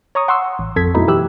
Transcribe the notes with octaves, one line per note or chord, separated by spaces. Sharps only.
C#5 A#5 C#6 D#6
F#5 C6 C#6 E6 C7
A1
F2 A4 G#6 B6
F#2 B2 A3 D#4 E4
E3 G4 E6 F#6